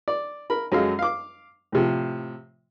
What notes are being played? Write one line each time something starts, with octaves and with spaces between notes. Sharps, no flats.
D5
A#4 B5
F#2 F#3 G#3 A4 F5
F5 D6
A2 C3 F3